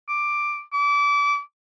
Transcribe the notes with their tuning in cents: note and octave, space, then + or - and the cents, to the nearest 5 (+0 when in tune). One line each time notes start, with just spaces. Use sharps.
D6 +5
D6 -30